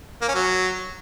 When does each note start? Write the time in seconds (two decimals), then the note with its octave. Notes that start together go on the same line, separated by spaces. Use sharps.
0.22 A#3
0.28 C#4
0.35 F#3